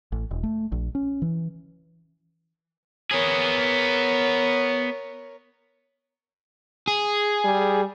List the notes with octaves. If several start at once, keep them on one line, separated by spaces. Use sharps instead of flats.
A1
E1
A3
A#1
C#4
E3
B3 G#4 A#4 C#5
G#4
G3